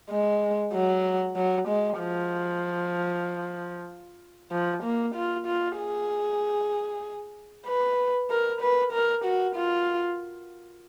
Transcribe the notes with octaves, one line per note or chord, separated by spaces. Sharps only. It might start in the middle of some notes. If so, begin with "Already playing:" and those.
G#3
F#3
F#3
G#3
F3
F3
A#3
F4
F4
G#4
B4
A#4
B4
A#4
F#4
F4